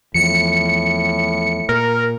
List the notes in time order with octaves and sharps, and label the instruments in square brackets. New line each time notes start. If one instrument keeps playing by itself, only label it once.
[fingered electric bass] E2 F3 [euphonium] A2 [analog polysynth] C#7
[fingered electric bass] A#2 [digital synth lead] A#4